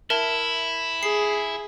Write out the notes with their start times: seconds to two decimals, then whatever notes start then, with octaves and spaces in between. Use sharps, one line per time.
0.10 E4 A#4 E5 A5
1.03 G#4 C7